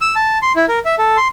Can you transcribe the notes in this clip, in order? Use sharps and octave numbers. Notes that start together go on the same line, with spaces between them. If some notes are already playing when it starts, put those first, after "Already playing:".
E6
A5
C6
E4
A#4
E5
A4
C6